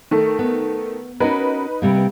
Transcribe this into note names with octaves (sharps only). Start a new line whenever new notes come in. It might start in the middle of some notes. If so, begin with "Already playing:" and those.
D#3 A3
B3
C#4 D#4 F#4 A#4 B4
C3 G3 A#3